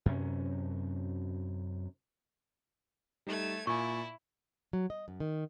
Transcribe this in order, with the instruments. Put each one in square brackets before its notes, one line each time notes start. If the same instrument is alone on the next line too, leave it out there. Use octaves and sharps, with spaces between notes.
[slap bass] F#2 C3 C#4
[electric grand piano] G3 D#4 [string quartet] A3 G#6
[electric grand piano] A#2 G#5 [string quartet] E4 [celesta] C#6
[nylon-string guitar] F#3
D#5
F#2
D#3